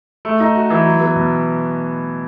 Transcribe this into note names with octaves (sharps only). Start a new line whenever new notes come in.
A3
D#4
F#4
E3
F#3
B3
B2